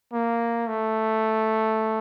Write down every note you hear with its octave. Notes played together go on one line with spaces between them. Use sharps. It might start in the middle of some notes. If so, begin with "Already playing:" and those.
A#3
A3